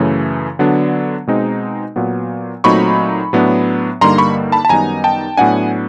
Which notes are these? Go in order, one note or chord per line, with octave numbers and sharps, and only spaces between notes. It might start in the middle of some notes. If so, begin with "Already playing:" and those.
Already playing: F#2 C#3 E3 A3
D3 F#3 B3 D4
B2 G#3 C4 D#4
A#2 F#3 B3
A#2 F#3 A3 C4 D#4 B5 C#6
A2 F#3 B3 D4
G2 D3 G3 A#3 D#4 A#5 C6
B5 C#6
A5 B5
A5
F#2 D#3 G3 B3 D#4 G#5 A#5
G5 A5
A2 F#3 B3 D4 F#5 G#5